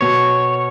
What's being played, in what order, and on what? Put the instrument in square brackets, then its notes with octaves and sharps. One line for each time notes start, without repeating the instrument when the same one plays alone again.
[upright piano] B2 B3 F#4 [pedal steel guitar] C#5